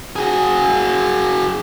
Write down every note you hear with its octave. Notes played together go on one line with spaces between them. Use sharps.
F#4 G#4